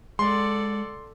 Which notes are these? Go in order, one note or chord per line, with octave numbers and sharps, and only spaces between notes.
G#3 A4 D5 F#5 C6